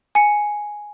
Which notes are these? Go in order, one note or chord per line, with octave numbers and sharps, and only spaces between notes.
G#5 C#7